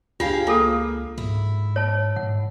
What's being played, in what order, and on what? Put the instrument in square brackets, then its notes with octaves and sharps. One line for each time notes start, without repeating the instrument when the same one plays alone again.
[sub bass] C#2 [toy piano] D4 F4 [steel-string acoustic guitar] G4 G#4 F5
[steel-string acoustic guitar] A#3 [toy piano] F4 G#4 A4
[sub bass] G#2 [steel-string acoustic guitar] E4
[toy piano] C#5 A5
[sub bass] G#2 [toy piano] F#5